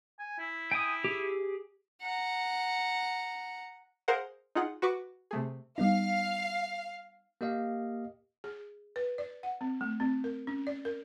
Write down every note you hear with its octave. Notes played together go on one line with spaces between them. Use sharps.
G#5
E4
G5 G#5 D#6
G4 G#4
F#5 A#5
G#4 A#4 C5 F5 F#5
D#4 F4 G#4 F#5
F#4 B4 C#6 D6
C3 A3 G#4
G3 B3 D#4 F5
A#3 G4 D#5 F5
G#4
B4
D5
F#5
C4
A3
C4
A#4
C#4
D5
A#4